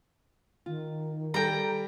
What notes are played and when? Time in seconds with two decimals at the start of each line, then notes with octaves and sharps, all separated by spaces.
0.66 D#3 F4
1.34 G3 G#4 A4 G5 A#5